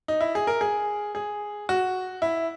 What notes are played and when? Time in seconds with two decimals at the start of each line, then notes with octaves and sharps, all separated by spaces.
0.08 D#4
0.21 E4
0.35 G#4
0.47 A#4
0.61 G#4
1.15 G#4
1.69 F#4
2.22 E4